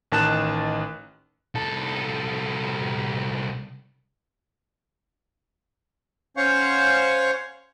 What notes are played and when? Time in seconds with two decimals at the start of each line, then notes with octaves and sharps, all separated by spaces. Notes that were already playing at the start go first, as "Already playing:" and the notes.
0.12 A1 D#3 A5 F#6 E7
1.55 C2 A4
6.37 C#4 C5 C#5 F5 F#5 C#6